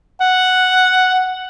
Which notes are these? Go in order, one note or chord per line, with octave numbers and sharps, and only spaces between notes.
F#5